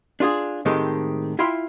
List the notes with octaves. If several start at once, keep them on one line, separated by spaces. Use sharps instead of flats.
D4 F4 G4 G#4
A2 D#3 G#3 C4 G4 A4
E4 F4 E5 G5 C6